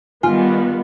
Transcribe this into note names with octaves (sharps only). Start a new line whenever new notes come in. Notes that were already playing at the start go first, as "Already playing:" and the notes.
D#3 G3 B3 F4 G#5